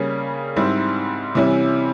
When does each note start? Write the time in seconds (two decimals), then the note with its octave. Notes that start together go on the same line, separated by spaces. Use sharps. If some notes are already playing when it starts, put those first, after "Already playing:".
Already playing: C#3 G3 A#3 C#4
0.56 G#2 G3 C4 E4
1.35 C3 E3 G3 C#4 E4